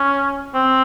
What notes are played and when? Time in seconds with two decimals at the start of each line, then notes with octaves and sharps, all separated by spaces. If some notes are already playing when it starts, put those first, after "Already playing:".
Already playing: C#4
0.55 C4